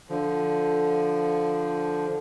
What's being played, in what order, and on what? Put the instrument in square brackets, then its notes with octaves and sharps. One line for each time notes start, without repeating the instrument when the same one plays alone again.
[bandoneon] D3 F3